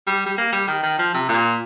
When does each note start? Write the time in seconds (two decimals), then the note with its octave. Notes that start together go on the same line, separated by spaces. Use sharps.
0.07 G3
0.26 G3
0.38 A#3
0.52 G3
0.68 D#3
0.83 D#3
0.99 F3
1.14 C3
1.29 A#2